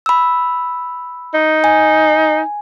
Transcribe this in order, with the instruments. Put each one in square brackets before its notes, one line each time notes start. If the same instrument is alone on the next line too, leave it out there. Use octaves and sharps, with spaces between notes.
[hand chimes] B5 E6
[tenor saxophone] D#4
[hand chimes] G#5